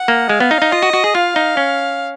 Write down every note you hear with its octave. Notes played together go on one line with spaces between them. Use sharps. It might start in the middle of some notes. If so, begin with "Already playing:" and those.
Already playing: F#5
A#3
G#3 F5
B3
D#4
D#4
F4 D#5
F#4
F#4
G#4
F4 F5
D#4
C#4